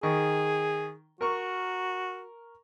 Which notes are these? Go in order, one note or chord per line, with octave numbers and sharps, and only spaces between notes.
D#3 G#4 C#6
F#4 A#4 C#6